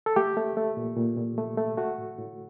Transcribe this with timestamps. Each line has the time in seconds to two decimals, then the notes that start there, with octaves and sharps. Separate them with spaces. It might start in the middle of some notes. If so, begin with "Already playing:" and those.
0.06 A4
0.16 A3 G4
0.37 A3
0.57 A3
0.77 A#2
0.97 A#2
1.17 A#2
1.38 A3
1.58 A3
1.78 A3 F#4
1.98 A2
2.18 A2